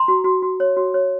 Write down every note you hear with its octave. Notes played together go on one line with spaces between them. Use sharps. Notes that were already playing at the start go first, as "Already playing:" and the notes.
Already playing: A#5 C6
F#4
F#4
F#4
C#5
F#4
C#5